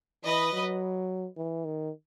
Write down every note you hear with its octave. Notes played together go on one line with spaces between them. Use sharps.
E3 B4 D#5
F#3
E3
D#3